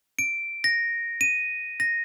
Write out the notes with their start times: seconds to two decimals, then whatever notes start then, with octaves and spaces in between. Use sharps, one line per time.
0.19 D7
0.64 A#6
1.21 D#7
1.80 A#6